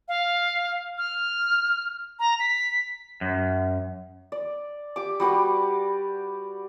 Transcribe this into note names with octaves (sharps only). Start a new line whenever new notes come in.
F5
F6
A#5
B6
F#2
D5
G4 D6
G3 F#4 G4 B4